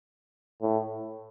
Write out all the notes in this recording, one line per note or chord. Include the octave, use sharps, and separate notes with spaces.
A2